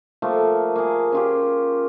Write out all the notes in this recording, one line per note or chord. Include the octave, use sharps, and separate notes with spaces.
F3 A3 A#3
A#3 G#4
C#4 F4 G4